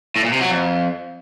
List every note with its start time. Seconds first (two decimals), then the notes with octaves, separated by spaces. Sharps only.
0.16 A2
0.24 A#2
0.33 C3
0.41 F#3
0.49 F2